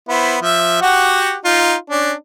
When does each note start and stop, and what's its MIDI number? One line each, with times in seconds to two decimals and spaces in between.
0.09 0.36 59
0.09 0.36 64
0.09 0.36 72
0.41 0.78 53
0.41 0.78 76
0.82 1.35 66
0.82 1.35 67
0.82 1.35 78
1.45 1.75 63
1.45 1.75 65
1.90 2.12 61
1.90 2.12 62